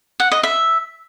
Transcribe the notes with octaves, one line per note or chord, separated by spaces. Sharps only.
F#5
D#5
E5